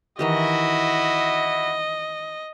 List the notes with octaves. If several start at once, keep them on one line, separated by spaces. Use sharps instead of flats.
D#3 E3 E4 F#4 G4 D#5